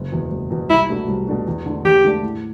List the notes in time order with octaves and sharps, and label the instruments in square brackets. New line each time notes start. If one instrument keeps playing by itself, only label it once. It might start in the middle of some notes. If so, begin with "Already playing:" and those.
Already playing: [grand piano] F#1
E2 B2
F#1
E2 B2
[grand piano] C2 [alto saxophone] E4
[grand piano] B2 A3 D4 F#4
C2
B2 A3 D4 F#4
E2
D3 A3 D4
[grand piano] E2 [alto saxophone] G4
[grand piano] D3 A3 D4
A2